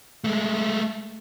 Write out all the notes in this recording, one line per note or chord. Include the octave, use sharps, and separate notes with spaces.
G#3 A3